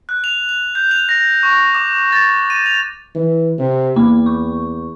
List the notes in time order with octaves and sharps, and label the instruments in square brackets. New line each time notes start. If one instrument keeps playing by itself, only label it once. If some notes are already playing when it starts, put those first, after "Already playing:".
[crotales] F#6
F7
F7
G6
F7
A#6
C#6
D6
A6
D#7
F7
[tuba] E3
C3
[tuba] E2 [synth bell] A#3 B5 D6
[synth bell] C#6